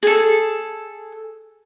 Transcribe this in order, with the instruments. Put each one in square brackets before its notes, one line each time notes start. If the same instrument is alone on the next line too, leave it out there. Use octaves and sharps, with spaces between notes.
[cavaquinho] G#4 A4